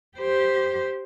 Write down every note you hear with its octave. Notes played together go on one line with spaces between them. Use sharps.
G4 C5